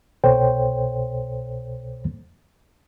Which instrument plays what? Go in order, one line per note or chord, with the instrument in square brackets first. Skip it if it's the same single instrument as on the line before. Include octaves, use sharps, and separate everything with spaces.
[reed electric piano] C2 B2 A4 C5 C#5 G5